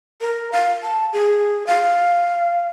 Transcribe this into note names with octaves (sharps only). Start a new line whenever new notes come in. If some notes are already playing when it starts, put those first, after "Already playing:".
A#4
F5
A5
G#4
F5